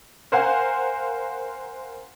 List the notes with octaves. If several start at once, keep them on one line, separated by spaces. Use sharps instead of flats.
A#4 C5 F5 F#5 G#5